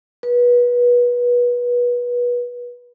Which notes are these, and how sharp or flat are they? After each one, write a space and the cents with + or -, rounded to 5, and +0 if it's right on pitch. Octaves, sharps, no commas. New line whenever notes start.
B4 -25